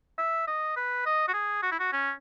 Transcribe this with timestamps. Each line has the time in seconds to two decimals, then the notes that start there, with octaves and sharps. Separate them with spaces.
0.18 E5
0.47 D#5
0.76 B4
1.06 D#5
1.28 F#4
1.33 G#4
1.62 F#4
1.71 E4
1.80 F#4
1.92 C#4